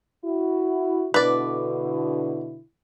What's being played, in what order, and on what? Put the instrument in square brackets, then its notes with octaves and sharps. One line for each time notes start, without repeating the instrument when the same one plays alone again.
[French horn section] E4 F#4
[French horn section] B2 D3 E4 [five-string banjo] B4 D5